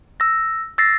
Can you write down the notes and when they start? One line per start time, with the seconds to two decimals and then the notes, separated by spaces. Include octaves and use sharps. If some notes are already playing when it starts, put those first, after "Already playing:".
0.20 E6 A#6
0.78 E6 A6 A#6 C7